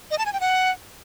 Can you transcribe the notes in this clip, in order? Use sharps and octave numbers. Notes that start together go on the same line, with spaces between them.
D#5
A5
G#5
G5
F#5